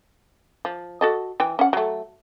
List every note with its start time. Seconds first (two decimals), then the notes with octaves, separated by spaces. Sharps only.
0.65 F3
1.01 F#4 A4 D#5
1.40 E3 G5
1.59 C#4 F#5
1.73 F#3 A3